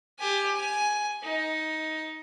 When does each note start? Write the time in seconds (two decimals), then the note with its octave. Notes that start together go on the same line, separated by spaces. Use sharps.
0.19 G4 G#5
0.55 G#5
1.23 D#4